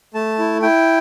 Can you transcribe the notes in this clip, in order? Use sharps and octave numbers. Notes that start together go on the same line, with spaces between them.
A3 A5
E4
E4 G5